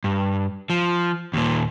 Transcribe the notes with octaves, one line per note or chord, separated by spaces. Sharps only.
G2
F3
D#2 A#2